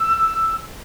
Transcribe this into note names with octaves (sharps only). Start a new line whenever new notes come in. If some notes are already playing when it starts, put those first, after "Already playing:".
Already playing: E6